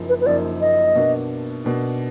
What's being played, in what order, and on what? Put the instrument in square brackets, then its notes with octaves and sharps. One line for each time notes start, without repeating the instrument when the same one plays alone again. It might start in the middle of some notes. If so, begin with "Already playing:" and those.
Already playing: [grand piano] F#1 F#2 F3 A#3 D#4
[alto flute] B4
B4
[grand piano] F#1 F#2 F3 A#3 D#4 [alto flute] D5
[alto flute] D#5
[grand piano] B2 A#3 D4
B2 A#3 D4